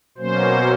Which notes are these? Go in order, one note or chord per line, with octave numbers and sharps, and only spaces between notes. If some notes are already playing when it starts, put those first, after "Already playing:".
B2 F#3 A#3 C#4 C5